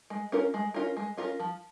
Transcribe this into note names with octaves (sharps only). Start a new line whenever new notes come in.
G#3
C#4 F4 A#4
G#3
C#4 F4 A#4
G#3
C#4 F4 A#4
F3